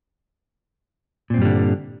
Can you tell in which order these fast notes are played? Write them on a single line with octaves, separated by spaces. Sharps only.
A#2 C4 G2 G3 D3